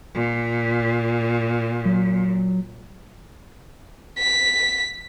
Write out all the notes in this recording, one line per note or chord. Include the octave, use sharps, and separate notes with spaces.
A#2
F#3
B6